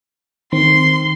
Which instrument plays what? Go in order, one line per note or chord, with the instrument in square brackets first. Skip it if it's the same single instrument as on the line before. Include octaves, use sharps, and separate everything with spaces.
[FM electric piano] D#3 C4 [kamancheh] C6